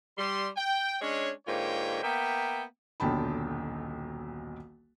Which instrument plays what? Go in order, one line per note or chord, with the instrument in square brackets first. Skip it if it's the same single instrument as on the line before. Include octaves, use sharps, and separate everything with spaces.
[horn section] G3 C6
G5
G#3 C#4 D4 C#5
G#2 D3 A#3 F4 C#5 G5
A#3 B3 E5 G5
[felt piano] D#1 B1 D3 G5 A5 B5